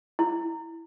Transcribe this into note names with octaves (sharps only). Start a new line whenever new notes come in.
E4